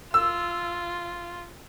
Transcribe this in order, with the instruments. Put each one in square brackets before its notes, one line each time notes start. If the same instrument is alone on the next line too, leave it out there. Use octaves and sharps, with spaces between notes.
[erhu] F4 [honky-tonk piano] E6